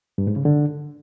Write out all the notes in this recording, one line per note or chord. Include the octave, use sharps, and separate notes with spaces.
G2
G#2
C#3
D3